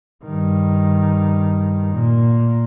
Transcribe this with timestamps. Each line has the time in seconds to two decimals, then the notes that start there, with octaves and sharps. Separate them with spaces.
0.25 G2 D#3
1.93 A#2